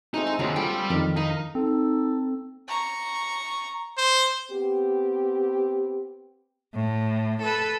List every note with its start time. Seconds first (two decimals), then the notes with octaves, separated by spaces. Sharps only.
0.14 G#3 A3 C4 D#4
0.27 G#4
0.39 D#2 D3 F#3 G#4
0.56 G3 F4 A4 F5 G5
0.90 F2 D#3 A#4
1.16 D#4 A#4 F5 B5
1.55 C4 D#4 A4
2.68 A#5 C#6
3.98 C5
4.51 B3 C4 G4
6.74 A2
7.42 A4 B4